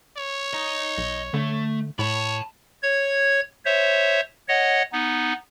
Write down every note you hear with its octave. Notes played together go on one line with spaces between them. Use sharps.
C#5
D#5 A#5
B1
D3 A3
A2 C#5 A5 B5
C#5 G#6
C5 C#5 E5
C#5 D#5 F#5
B3 D#4